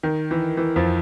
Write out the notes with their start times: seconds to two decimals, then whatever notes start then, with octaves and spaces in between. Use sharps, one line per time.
0.03 D#3
0.31 E3
0.57 E3
0.76 F2 F3